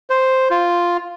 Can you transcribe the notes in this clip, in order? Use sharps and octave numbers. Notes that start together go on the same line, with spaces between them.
C5
F4